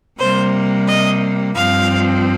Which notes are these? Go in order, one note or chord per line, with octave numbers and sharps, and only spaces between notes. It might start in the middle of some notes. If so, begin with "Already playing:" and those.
C3 G3 A#3 C5
D#5
G2 F3 C4 F5